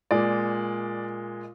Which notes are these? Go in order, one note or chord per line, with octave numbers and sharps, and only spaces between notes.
A#2 G#3 D5